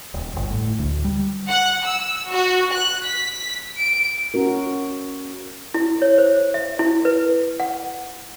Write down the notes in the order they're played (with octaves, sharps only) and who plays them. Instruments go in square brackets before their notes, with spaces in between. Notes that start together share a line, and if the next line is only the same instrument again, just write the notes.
[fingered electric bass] D#1
G1
A2
D2
G3
[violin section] F#5
E6
F#4
F#6
B6
D7
[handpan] C#4 F#4 A#4
[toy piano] E4
C#5
C5
E5
E4
B4
F#5